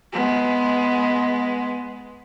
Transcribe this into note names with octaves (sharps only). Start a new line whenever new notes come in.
G#3 B3